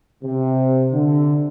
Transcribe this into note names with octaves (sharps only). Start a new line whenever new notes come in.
C3
D3